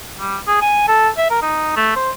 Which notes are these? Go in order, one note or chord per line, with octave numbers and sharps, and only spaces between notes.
G3
G#4
G#5
A4
E5
A#4
D#4
A3
C5